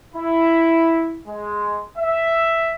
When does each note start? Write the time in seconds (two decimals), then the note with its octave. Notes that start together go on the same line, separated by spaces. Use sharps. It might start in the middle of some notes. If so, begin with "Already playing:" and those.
0.15 E4
1.27 G#3
1.98 E5